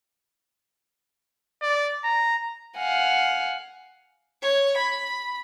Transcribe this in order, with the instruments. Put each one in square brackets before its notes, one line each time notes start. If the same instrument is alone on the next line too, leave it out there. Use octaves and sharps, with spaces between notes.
[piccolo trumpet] D5
A#5
[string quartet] F5 F#5 G#5
[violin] C#5
B5